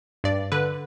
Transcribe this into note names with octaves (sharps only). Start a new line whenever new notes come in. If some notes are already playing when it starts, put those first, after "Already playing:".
G2 D5
D3 B4